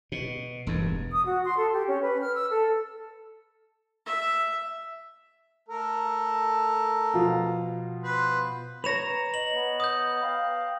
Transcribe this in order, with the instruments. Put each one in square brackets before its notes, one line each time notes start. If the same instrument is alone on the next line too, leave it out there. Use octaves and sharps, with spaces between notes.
[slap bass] B2
E1 G2
[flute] D#6
F#4
C6
A4
G4
C#4
B4
F6
E6
A4
[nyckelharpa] E5
[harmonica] A3 A4 A#4
[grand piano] B2 F3 F4
[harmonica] B4 C5
[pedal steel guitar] B4 C#5 A#5 [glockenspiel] A#6 E7 F7
[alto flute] D#5 [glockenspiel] F#7
[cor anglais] B3
[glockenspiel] D#6 G6
[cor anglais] F5 [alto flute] G5